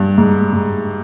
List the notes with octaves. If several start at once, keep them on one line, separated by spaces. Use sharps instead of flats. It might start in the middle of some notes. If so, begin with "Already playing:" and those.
Already playing: G2
G#2
G#2